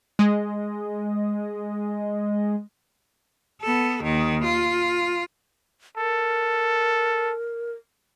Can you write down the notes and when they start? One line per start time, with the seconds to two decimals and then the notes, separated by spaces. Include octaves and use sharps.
0.19 G#3 D#5
3.62 B3 A4
4.03 D#2 D#3
4.44 F4
5.97 A4 A#4